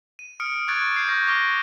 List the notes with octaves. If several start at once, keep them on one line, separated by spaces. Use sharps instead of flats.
D#7
D#6 F6 C#7 D7
C#6 D6 F#6 G#6 A6 D7
G6 C7 D7
C#6 F6 G6 A#6
C#6 D6 A#6 D7 G7